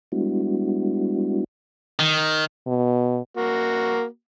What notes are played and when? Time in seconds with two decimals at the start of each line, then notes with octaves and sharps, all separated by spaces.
0.12 G3 G#3 B3 D4 E4 F#4
1.99 D#3
2.67 B2
3.36 A#3 F#4